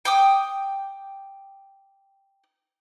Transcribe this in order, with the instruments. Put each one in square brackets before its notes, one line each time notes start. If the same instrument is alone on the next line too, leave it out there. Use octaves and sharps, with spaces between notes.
[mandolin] G5 D6 D#6